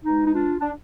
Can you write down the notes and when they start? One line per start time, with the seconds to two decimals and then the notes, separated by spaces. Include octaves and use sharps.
0.05 B2 G#3 D#4
0.26 D#4
0.33 D4 F4
0.59 D4